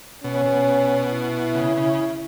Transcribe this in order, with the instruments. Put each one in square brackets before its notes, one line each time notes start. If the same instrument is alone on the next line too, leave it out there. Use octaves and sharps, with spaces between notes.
[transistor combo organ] B2 [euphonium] C#4
[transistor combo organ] B2
[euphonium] E4
[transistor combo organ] C#3
C#3